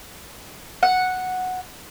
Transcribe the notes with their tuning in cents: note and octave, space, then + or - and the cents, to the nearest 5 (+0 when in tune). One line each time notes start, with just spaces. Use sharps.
F#5 -5